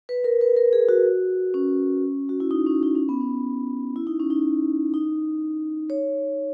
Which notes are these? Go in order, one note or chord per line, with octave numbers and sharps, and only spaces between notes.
B4
A#4
B4
A#4
G#4
F#4
C#4
F#4
E4
D#4
C#4
D#4
C#4
B3
C#4
E4
D#4
C#4
D#4
D#4
C#5